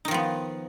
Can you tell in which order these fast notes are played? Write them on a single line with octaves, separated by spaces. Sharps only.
D#4 D#3 F3 B3